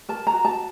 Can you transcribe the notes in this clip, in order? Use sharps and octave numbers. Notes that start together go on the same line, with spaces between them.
A#4 A5
A#5
F#4
A5